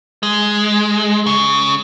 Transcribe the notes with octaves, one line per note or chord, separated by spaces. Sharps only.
G#3
C#3